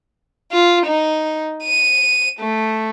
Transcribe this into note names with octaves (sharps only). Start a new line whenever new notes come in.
F4
D#4
D#7
A3